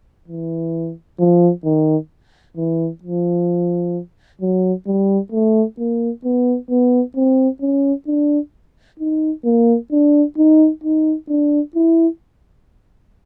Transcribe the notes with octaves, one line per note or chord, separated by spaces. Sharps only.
E3
F3
D#3
E3
F3
F#3
G3
A3
A#3
B3
B3
C4
C#4
D4
D#4
A#3
D4
D#4
D#4
D4
E4